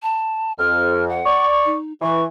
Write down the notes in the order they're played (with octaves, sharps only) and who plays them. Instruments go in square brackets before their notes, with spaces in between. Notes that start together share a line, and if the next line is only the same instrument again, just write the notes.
[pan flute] A5
[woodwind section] F2 [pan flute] F6
[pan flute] F#5
[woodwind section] D5 C#6
[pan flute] D#4
[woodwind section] E3 [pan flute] C#6